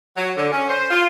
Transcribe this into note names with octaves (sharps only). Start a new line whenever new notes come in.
F#3
D3
C#4
C5
F4